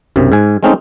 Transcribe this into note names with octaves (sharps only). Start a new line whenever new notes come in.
B1 F#2 C3
G#2 G#5
G#3 A3 C4 C#4 D#4